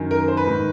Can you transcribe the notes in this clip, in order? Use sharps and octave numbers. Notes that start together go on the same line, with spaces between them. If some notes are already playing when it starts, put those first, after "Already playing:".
Already playing: F#2 D#3
A#4
C5
B4
G#2 D#3